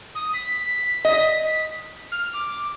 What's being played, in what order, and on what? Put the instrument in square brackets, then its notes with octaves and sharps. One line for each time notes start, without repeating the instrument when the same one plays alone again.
[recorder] D#6
B6
[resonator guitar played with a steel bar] D#5
[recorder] F6
D6